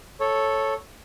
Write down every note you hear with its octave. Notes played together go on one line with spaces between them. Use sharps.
A4 C#5